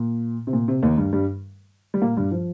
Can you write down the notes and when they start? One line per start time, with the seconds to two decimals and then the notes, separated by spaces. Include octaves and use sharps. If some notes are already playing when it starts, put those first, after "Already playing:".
Already playing: A#2
0.47 C3
0.53 A#2
0.68 C3
0.83 D#2 D#3
0.97 G2 G3
1.13 G2 G3
1.94 G3
2.02 A#2 A#3
2.17 G2 G3
2.31 F3